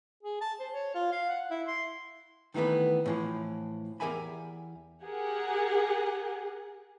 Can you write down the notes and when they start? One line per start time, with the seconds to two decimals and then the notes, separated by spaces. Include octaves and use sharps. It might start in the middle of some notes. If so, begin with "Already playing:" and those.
0.23 G#4
0.41 A5
0.60 C5
0.73 C#5
0.95 F4
1.12 F5
1.30 F#5
1.51 E4
1.68 C6
2.54 D#3 E3 A3 B3 B4
3.06 A2 E3 F3
4.00 E2 G4 A#4 E5 G#5 B5
5.04 G4 G#4 A#4 F#5